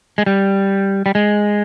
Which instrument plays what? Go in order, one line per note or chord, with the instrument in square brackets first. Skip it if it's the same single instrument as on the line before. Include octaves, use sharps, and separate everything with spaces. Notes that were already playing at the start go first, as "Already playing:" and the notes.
[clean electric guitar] G#3
G3
G3
G#3